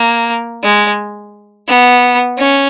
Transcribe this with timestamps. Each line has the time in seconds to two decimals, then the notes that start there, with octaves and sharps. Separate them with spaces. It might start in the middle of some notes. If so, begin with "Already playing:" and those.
Already playing: A#3
0.63 G#3
1.68 B3
2.37 C#4